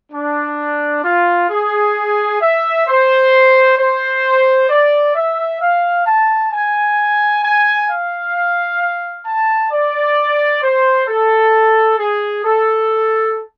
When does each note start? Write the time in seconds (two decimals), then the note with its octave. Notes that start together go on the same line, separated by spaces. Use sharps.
0.12 D4
1.04 F4
1.50 G#4
2.41 E5
2.86 C5
3.77 C5
4.70 D5
5.14 E5
5.61 F5
6.06 A5
6.52 G#5
7.43 G#5
7.89 F5
9.26 A5
9.71 D5
10.63 C5
11.08 A4
11.99 G#4
12.45 A4